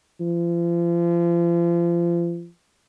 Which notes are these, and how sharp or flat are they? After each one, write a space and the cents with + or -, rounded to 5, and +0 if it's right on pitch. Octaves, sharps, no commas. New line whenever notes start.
F3 -35